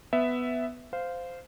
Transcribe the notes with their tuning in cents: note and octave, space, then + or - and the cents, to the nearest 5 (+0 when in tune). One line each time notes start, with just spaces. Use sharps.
B3 +10 E5 +0
C5 -15 F5 +0